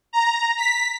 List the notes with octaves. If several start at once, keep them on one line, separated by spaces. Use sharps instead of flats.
A#5
B6